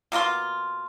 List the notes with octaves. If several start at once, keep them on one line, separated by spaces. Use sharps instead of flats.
B2 A#3 F4 C6